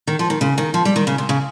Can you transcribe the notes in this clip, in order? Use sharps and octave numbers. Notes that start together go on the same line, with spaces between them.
D#3
F3
D#3
C#3
D#3
F3
G3
D#3
C#3
C3
C#3